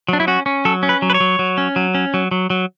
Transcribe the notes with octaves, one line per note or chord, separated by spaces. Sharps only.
F#3 D4
E4
C#4 F#4
C#4
F#3 A4
C#4
B4
F#3
B4
C#5
F#3
F#3
C#4
F#3
C#4
F#3
F#3
F#3